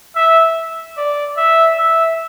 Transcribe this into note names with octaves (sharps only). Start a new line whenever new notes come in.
E5
D5
E5
E5